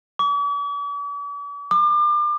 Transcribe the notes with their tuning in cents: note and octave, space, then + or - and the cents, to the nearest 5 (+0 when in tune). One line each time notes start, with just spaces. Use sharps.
D6 -45
D6 +35